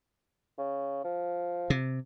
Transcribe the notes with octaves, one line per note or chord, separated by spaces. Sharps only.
C#3
F3
C3